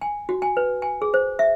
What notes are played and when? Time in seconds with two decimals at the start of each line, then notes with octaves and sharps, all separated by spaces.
0.01 G#5
0.29 F#4
0.42 G#5
0.57 B4
0.82 G#5
1.02 G#4
1.14 C5
1.39 E5